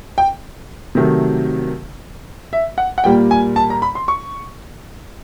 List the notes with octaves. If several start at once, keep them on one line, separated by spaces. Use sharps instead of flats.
G5
C3 D#3 F#3 A3
E5
F#5
F#5
A#2 G3 A#3 G5
G#5
A5
A#5
B5
C6
C#6